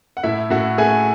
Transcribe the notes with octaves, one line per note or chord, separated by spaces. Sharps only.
F#5
A2 E4 E5
A2 F#4 F#5
A3 G#4 G#5